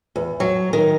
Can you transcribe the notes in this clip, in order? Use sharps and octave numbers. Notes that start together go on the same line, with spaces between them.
E2
F#3
D#3